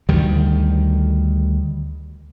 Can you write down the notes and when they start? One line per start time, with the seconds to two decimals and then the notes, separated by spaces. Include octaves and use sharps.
0.09 D2 D#3 G3